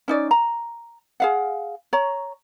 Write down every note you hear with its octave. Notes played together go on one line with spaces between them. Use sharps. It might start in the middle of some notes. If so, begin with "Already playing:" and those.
C#4 D#4 D5
A#5
G#4 F5 F#5
C#5 A#5